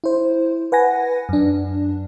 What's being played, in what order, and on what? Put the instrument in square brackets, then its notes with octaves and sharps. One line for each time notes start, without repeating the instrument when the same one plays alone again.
[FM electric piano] E4 C5
B4 F#5 G#5 A#6
F#2 D4